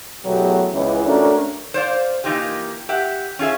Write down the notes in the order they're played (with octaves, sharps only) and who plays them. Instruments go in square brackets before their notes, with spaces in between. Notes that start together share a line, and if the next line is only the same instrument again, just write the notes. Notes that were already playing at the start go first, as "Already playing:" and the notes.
[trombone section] E2 B2 F#3 A3 B3 G4
C#2 E3
A3 C#4 D4 F#4 A#4
[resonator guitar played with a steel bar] C5 D5 F5
E3 A#3 D#4 F4 G4
G4 E5 F#5
C#4 F4 G#4 E5